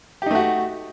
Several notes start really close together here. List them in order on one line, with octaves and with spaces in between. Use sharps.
G4 D#4 A3 F#4